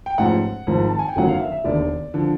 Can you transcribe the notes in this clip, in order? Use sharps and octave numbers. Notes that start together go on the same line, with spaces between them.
G5
A1 G#2 F3 F#5
G#1 G#2 F3
A5
G#5
G5
G1 F#2 D#3 F#3 F#5
F5
E5
E5
E1 D#2 D3 D5
D3 F3